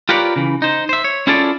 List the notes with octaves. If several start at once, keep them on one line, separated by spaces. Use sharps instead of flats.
F4 G4 A#4 B4 C#5 D5
C#3 E3
D#4 C5
C5 E5
C#5
C#4 E4 F4 G#4 A4 D5